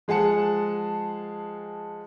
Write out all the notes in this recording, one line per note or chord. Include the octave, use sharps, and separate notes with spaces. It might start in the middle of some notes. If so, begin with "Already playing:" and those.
F3 G#3 G#4 F#5 A5 C#7